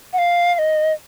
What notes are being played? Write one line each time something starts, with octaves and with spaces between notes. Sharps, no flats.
F#5
F5
F5
D#5